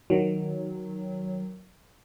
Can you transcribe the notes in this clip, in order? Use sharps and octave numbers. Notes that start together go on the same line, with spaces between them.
D#3 F#3